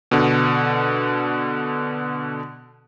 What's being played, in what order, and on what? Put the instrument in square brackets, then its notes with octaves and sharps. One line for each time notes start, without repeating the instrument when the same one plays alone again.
[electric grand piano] B2 D3